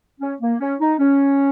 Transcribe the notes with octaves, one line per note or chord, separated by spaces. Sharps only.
C#4
A#3
C#4
D#4
C#4